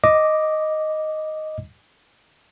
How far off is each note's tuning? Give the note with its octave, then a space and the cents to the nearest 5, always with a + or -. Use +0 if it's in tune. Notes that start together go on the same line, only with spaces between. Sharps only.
D#5 +0 D6 +0